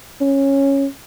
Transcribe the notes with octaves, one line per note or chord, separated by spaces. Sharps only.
C#4